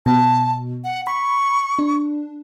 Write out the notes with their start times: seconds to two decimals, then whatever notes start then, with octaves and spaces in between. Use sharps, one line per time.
0.06 B2 A5
0.84 F#5
1.07 B5 C#6
1.79 D4